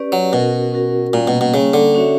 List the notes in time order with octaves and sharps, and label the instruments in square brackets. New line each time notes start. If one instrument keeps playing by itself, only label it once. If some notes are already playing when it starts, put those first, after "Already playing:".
Already playing: [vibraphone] C#4 G4 B4 D5
[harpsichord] F#3
[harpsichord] B2 [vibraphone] C#4 F#4 A#4
[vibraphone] C#4 F#4 A#4
[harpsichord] A#2 [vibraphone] G3 A#3 C#4
[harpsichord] B2
B2
[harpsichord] C#3 [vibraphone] G3 A#3 C#4
[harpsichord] D3
[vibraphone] C#4 F#4 C#5 E5